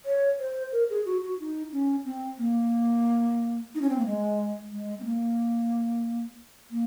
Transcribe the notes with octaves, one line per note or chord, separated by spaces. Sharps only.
C#5
C5
A#4
G#4
F#4
F#4
D#4
C#4
C4
A#3
D#4
C#4
C4
A#3
G#3
G#3
C4
A#3
A#3